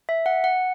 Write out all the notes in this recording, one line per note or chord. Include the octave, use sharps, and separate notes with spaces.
E5
F#5
F#5